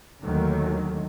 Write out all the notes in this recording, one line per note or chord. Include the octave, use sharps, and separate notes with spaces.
D#2 D3 D#3 F#3 A3